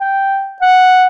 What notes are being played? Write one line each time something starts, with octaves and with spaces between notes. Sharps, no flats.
G5
F#5